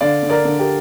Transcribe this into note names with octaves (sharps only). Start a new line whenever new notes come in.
D3 D5 F5
D3
A#4 D5
D3
G4 A#4